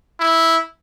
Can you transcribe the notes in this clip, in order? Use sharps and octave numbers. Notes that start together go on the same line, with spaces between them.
E4